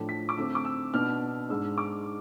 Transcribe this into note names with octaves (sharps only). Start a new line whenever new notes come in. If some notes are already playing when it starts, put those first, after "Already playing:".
Already playing: A2 F3 A3 D4
B6
D6
D3 A3 C4 E6
D6
E6
B2 B3 D4 F6
G#2 G#3 D4 E6
D6